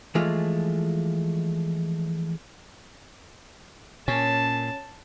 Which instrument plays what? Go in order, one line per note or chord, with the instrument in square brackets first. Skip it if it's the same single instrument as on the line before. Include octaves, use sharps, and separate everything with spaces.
[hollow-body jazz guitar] E3 F3 G#3 A3 F4
[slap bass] A#2 [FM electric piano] C#4 [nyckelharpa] A5